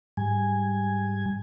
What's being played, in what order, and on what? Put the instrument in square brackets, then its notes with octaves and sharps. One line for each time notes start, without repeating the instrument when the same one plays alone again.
[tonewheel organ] G#2 G3 G#5